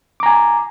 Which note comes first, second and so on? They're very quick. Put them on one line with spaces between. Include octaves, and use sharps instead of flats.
D6 A#5 G#5